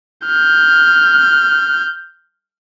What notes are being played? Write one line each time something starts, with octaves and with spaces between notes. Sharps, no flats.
F6 G6